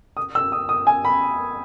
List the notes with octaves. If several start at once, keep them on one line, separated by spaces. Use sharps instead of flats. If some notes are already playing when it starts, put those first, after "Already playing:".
D#6
E6
D#6
D#6
G#5
B5